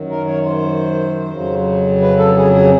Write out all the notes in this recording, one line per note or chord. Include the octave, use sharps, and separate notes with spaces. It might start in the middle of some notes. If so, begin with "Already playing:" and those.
Already playing: F#2 D#3 F#3
A#4
C#5
C5
F2 C#3 F#3
B4
A4
G#4
G#4